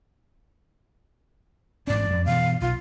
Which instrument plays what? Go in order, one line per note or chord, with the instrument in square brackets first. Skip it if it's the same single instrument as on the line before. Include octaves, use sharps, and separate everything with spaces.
[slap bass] A1 G#2 C#4 [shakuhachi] D5
[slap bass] F2
[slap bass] G2 B2 E3 [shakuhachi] F5
[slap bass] B1 [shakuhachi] F4